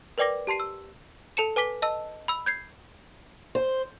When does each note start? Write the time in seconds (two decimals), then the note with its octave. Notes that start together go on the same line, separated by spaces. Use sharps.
0.18 A#4 B4 D5 G5 D6 A#6
0.47 G4 A5 C6 C7 D#7
0.60 E6
1.37 A4 A5 C#7 E7
1.56 B4 G#5 D6 B6 G7
1.82 D#5 A5 E6
2.28 B5 E6
2.46 G6 G#6 C7
3.55 C5